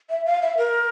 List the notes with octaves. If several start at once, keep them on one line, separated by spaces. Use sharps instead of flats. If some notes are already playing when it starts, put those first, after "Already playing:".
E5
F5
E5
A#4